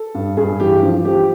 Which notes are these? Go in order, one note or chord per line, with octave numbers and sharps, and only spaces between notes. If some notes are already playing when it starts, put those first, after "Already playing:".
Already playing: A4
G2
G2 G#4
E3 G4
F3
F3 G4